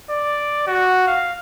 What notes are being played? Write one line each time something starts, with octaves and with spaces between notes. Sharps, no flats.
D5
F#4
F5